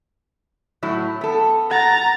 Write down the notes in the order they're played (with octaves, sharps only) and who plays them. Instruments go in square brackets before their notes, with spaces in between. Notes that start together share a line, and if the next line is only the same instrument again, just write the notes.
[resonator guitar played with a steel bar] A2 F#3 E4
B3 A4
[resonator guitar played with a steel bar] F#5 [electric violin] A#5 A6